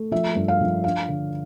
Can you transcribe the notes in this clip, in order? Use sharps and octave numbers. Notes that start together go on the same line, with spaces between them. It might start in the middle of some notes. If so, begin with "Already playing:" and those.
Already playing: A3
F3 E5
G2
F5
F3
D4 F5
D3